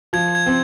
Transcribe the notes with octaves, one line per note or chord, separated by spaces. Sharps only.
F3 G#6
G#6
C4